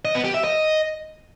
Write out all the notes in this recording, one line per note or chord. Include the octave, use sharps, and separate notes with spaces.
D#5
B3
G4
E5
D#5